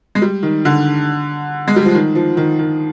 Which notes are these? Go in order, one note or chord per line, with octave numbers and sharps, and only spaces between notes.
G#3
G3
D#3
D3
G#3
G3
F3
D#3
F3
D#3
D#3